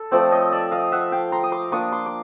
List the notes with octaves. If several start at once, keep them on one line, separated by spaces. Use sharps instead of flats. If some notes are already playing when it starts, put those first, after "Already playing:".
Already playing: A4
F3 A3 C4 C5 D5
C#5 D#5
D5 E5
D#5 F5
E5 F#5
F5 G5
A#5 C6
D#6
C6 D6
A#3 D4 F4 C#6 D#6
C6 D6
D6